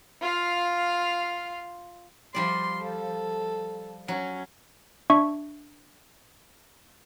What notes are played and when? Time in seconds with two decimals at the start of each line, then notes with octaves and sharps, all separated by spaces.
0.21 F4 F5
2.34 F3 G3 D5 C6
2.82 A4
4.08 F#3 C#4
5.10 D4 E5 C#6